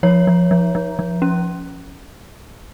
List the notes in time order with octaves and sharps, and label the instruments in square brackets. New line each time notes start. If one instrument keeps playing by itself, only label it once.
[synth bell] F3 C#5
F3
F3
F3
F3
C#4